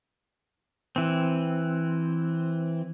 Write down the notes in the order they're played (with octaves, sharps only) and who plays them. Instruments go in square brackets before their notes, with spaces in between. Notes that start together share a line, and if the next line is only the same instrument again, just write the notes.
[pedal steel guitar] E3 C4